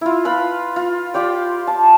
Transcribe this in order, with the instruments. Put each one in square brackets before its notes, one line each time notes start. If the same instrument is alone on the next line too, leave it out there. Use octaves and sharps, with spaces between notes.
[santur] E4 F4
F4 B4 B5
F4
F4 G4 D5 G5
A5